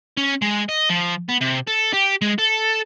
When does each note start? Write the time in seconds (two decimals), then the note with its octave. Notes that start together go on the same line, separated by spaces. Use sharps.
0.17 C#4
0.42 G#3
0.69 D#5
0.90 F3
1.29 B3
1.41 C3
1.68 A4
1.93 G4
2.22 G#3
2.38 A4